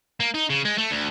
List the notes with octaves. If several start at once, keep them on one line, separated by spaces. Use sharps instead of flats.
A#3
D#4
C#3
G#3
A3
D2